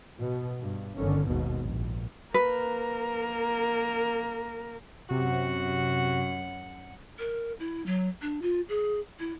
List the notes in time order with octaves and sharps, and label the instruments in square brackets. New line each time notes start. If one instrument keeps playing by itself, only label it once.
[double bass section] B2
G2
G1 D3 D#3 C#4
G#1 D#2 G#2 B2
A#1
[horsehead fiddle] A#3 A#4 [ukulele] B4
[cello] F#2 F#5 [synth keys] C3 [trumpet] F#4
[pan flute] A#4
E4
F#3
D4
F4
G#4
E4